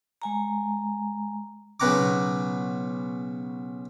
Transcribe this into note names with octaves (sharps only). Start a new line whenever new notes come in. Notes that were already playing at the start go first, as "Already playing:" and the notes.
G#3 G#5 A#5
B1 C#3 B3 F#5 A#5 D6